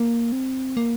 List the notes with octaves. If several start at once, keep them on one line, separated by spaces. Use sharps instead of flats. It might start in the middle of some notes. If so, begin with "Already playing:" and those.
Already playing: A#3
C4
A#3